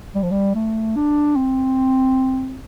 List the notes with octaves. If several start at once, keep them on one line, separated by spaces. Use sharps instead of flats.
G3
F3
G3
A3
D4
C4